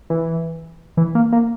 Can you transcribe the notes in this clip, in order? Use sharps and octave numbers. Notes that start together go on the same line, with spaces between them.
E3
E3
A#3
A#3